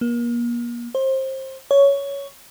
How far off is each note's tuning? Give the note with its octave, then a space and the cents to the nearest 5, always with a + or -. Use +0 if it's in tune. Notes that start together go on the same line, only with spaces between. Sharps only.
A#3 +35
C5 +25
C#5 +10